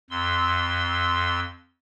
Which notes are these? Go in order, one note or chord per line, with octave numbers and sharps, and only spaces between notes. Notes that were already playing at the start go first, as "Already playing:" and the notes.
F2 C6 E6